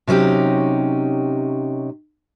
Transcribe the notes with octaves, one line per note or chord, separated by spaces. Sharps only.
C3 F#3 C#4 D#4 G4